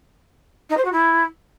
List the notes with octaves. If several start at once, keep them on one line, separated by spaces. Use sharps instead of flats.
D#4
C5
F#4
E4